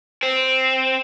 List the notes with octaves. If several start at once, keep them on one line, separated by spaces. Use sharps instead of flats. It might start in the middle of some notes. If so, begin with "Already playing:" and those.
C4